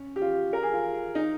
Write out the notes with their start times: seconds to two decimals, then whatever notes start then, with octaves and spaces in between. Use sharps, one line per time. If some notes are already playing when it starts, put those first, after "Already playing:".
Already playing: C#4
0.16 G4
0.21 F4
0.53 A#4
0.63 G#4
0.73 F4
1.15 D#4